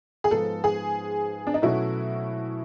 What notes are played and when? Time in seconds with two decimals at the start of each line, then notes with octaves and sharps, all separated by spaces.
0.24 G#4
0.30 G#2 F3 G#3 B3 D#4 A4
0.64 G#4
1.47 D4
1.54 D#4
1.62 B2 F#3 A3 C#4 E4 F#4